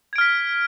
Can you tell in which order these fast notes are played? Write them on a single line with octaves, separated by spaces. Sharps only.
G#6 D7 F6 B6